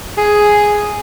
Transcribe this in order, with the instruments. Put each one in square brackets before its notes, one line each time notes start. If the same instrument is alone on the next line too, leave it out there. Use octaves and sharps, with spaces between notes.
[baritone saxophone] G#4